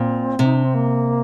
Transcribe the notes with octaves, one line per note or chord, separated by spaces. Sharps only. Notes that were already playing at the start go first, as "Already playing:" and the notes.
Already playing: A#2 C4
C3
D#4
D4
C4
A#3